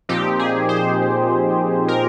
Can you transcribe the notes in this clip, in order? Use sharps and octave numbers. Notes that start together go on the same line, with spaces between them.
A#2 F3 C4 D#4 G4
G#4
C5
A#4